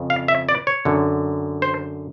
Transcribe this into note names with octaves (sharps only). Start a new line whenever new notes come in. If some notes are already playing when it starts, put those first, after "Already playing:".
Already playing: F2 C#3
F5
E5
D5
C#5
F#2 D3
C5